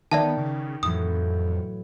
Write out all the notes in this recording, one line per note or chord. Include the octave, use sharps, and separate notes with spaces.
D#3 B3 D5 E5 A5
C#3 D6
F2 A2 E3 F#3 D#6